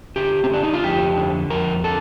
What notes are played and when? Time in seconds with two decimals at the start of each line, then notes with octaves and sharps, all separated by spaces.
0.16 D3 G4
0.44 C4
0.50 D3 D4
0.63 D#4
0.74 F4
0.84 F2 G4
1.17 D3
1.50 F2 A#4
1.84 D3 A4